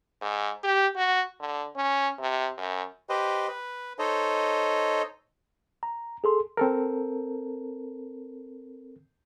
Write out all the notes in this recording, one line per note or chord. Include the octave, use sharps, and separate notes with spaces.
G#2
G4
F#4
D3
C#4
C3
F#2
G4 B4 C5 D#5
B4
D#4 A4 C5 C#5 D#5
A#5
G#4 A4 C6
C4 A4 A#4